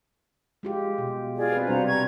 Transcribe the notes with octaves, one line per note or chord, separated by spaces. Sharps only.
G#3 F4 G4
B2
F4 G#4 D5
C4 B4
C3 G3 D4 F#4 C5 A#5
A#5 C#6 G#6